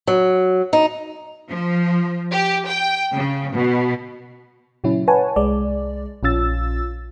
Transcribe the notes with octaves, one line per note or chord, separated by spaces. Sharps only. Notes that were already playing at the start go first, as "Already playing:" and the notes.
F#3
D#4
F3
G4
G5
C#3
B2
A#2 C#3 F#3 C#4 E4
B4 C#5 F#5 G#5 A5
C2 G#3 D5
A#1 C#4 F4 E6 A6